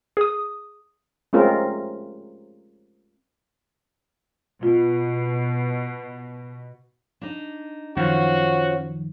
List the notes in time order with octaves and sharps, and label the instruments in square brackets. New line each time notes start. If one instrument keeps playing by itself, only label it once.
[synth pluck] G#4 D#6
[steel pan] G#3 A3 C4 C#4 F4 A#4
[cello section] B2 [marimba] F4
[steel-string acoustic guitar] D4 D#4
[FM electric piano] F#2 D#3 F3 [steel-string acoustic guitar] C#4 F4 C5 [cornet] F#4